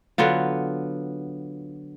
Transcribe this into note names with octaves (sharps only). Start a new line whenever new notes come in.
D3 F#3 B3 F4